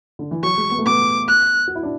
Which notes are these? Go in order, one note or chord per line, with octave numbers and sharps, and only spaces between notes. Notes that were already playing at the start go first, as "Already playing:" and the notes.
D3
E3
F#3 C#6
G#3
B3
A3
B3 D6
F#6
F#4
E4
D4